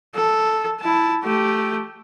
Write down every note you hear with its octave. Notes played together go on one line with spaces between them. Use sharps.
A4
E4 A5
A3 G4